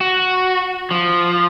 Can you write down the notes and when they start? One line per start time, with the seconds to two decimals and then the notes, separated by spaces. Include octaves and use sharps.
0.01 F#4
0.91 F3